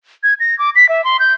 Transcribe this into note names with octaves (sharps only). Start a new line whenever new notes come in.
G#6
A#6
D6
B6
E5
C6
G6